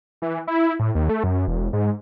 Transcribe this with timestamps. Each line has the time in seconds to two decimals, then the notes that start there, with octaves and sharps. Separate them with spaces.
0.22 E3
0.47 E4
0.79 A2
0.95 D#2
1.09 A3
1.24 F#2
1.48 E1
1.73 G#2